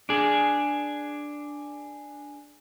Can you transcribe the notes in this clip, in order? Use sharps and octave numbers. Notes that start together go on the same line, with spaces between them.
D4 G#4